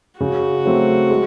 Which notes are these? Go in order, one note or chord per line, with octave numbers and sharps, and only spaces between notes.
C#3 F#4
F#3 A3 C4
G#3